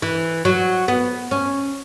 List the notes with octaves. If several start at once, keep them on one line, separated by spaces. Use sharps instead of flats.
E3
F#3
B3
C#4